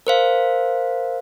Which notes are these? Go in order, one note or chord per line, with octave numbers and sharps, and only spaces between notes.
A#4 C5 F5